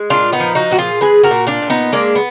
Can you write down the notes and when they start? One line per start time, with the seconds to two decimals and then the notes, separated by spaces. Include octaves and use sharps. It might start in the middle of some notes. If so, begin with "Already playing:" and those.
Already playing: G#3
0.10 A#2 D4 F4
0.32 B3 D#4
0.40 F3
0.55 D#4 F#4
0.71 A#2 F#4
0.78 F4 G#4
1.01 G#3 G#4 B4
1.23 F#4 A#4
1.31 A#2
1.47 D4 F4
1.62 A#2
1.70 B3 D#4
1.92 G#3 A#3 D4
2.15 B3